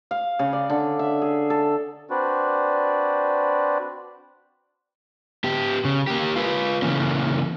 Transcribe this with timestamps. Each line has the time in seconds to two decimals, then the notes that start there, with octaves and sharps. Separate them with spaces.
0.11 F5
0.39 C#3
0.53 D5
0.70 D3
0.99 E5
1.22 G#4
1.50 A4
2.10 C4 D4 F#4 B4 C5 D5
5.44 B3 G4
5.85 C#3
6.07 A#3 G4
6.36 F4 B4
6.82 C#3 E3 A#3 C#4